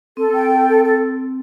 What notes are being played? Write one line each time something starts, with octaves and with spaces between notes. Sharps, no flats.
C4 A4
G5
A4
A4
A4